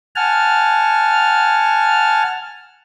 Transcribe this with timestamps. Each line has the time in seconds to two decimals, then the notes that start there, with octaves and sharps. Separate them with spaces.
0.16 F#5 G#5 A5 F6